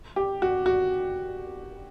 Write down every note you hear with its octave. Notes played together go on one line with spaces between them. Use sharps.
G4
F#4
F#4